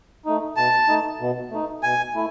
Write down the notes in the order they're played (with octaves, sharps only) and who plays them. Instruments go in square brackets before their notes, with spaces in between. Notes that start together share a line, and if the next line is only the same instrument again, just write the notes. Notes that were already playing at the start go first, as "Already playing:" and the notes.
[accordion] A3 D#4
[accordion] B2 [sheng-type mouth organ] A5
[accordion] A3 D#4
B2
A3 D#4
[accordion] B2 [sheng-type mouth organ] G#5
[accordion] A3 E4